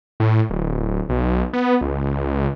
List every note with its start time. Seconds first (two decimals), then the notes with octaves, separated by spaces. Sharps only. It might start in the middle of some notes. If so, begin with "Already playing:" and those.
0.20 A2
0.50 D1
1.09 B1
1.53 B3
1.81 C#2